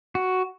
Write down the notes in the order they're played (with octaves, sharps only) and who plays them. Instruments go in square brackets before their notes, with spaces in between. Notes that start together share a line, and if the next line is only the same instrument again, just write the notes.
[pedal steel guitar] F#4